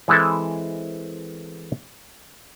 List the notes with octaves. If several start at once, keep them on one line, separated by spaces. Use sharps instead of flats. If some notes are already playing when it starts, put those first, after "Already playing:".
E3 G#3 C4 E4 A4